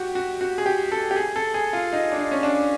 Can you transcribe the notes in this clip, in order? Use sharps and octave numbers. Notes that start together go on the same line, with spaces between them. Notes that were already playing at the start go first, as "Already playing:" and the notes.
Already playing: F#4 G4
F#4
F#4
G#4
G4
A4
G4
G#4
A4
G#4
F4
D#4
D4
D#4
C#4
D4